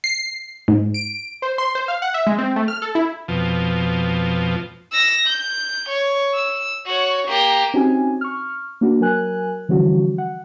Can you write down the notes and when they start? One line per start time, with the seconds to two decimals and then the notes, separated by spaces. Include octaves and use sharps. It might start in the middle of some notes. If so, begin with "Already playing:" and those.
0.04 C7
0.68 G#2
0.94 D7
1.42 C5
1.58 C6
1.75 C5
1.88 F5
2.02 F#5
2.14 E5
2.27 G#3
2.38 C4
2.56 A3
2.68 F6
2.82 A4
2.95 E4
3.28 F2 B2 F3
4.92 E6 A#6
5.27 G6
5.89 C#5
6.34 E6
6.86 F#4 C#5
7.27 A#3 G4
7.74 C4 C#4 D#4 F#4 G4 G#5
8.21 C#6 F6
8.81 A#3 D4 F#4
9.01 F#3 A#4 G#5 F#6
9.69 D3 E3 F3 G3 C#4 F#4
10.18 F#5